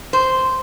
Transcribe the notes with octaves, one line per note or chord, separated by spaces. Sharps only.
C5